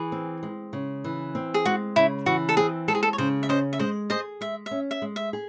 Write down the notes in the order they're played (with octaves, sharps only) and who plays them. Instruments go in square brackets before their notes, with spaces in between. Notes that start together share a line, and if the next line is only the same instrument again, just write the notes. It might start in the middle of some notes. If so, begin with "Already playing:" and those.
Already playing: [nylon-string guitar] E3 [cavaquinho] G#4
[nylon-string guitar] C4
G#3
C#3
E3
C4
[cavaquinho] G#4
[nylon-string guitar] G#3 [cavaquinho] F#4
[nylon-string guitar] C#3 [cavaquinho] E4
[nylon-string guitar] E3 [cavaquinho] F#4
[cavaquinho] A4
[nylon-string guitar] C4 [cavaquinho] G#4
[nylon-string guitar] G#3 [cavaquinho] A4
[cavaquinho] G#4
A4
C#5
[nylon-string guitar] C#3 [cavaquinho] C5
[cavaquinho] E5
[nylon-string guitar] C#4 [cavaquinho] C5 D#5
[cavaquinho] E5
[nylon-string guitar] G#3 [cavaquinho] C5 D#5
[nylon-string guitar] G#4 [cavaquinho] C5 D#5
[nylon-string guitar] G#3 [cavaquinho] E5
[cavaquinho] E5
[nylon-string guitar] C#4
[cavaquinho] E5
[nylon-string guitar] G#3
[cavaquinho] E5
[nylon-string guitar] G#4